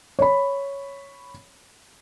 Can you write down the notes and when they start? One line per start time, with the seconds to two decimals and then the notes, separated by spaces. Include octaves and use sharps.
0.19 C#5 B5